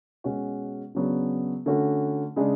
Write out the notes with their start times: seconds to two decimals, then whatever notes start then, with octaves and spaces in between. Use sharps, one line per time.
0.24 B2 G#3 C#4 F#4
0.95 C#3 F#3 B3 D4 G#4
1.66 D3 A3 C#4 F#4
2.36 C#3 G#3 D4